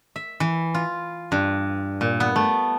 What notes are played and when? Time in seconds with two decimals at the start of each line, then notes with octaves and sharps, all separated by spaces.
0.16 E5
0.40 E3
0.74 F4
1.32 G2
2.01 A#2
2.20 B3
2.36 A3